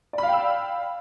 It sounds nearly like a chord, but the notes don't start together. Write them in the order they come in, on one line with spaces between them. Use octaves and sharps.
D5 B5 F5 G5 E6